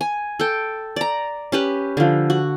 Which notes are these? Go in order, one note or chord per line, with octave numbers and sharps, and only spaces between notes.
G#5
A4 G5
D5 A#5
C#4 G4 B4
D3 F3
F#4